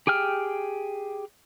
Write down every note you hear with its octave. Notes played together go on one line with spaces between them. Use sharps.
G4 G#4 G5 F6